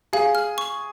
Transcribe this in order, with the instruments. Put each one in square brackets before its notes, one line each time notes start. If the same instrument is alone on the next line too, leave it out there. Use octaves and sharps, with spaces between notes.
[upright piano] G#4 [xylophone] F5
[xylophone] F6
C#6